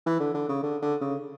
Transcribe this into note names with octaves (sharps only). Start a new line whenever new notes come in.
E3
D3
D3
C#3
D3
D3
C#3